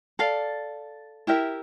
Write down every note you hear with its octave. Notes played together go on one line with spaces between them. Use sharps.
A4 D5 F5
E4 G4 A#4 E5